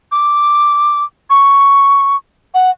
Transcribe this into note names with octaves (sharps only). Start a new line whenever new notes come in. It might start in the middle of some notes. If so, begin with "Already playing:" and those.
D6
C#6
F#5